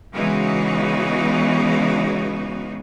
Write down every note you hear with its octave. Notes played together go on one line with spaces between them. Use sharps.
C#3 E3 G#3 B3 D#4 F#4